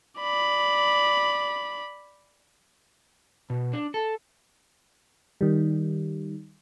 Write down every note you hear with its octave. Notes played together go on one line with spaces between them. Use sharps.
D5 B5
B2
D4
A4
D#3 G3